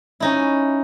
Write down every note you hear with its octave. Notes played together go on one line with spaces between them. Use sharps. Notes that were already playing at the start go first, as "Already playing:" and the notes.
C#4 D#4 E4